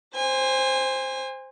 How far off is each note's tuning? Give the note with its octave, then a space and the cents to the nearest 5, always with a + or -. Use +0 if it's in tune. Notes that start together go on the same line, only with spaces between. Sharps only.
C5 +0 G#5 -30